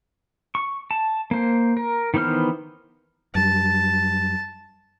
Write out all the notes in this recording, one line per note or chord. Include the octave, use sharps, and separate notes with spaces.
C#6
A5
A#3 C5
A#4
D#3 E3 B3 C5 F6
F#2 G3 A5